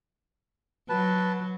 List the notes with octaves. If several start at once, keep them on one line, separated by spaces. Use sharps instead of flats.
F#3 B4 A5